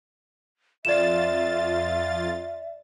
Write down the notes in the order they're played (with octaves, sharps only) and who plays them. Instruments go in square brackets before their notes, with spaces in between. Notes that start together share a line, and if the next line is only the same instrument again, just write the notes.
[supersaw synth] F2 F4 A6 [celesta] D5 E7 [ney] E5